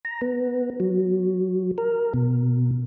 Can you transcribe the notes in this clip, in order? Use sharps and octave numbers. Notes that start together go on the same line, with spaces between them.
A#5
B3
F#3
A#4
B2